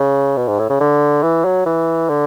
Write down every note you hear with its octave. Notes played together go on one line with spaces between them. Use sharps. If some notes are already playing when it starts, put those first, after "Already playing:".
Already playing: C#3
B2
G#2
A2
C#3
D3
E3
F#3
E3
D3